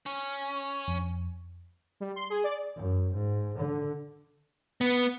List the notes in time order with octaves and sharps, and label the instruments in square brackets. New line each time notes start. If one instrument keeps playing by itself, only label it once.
[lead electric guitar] C#4
[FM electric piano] F2
[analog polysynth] G3
C6
G#4
D5
[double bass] F#2
G#2
D3
[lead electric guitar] B3